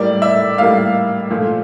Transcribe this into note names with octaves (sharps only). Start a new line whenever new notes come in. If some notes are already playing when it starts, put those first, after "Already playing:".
Already playing: A2 G3 A#3 D5
E5
A2 G3 A#3 F5
A#2 F3 A3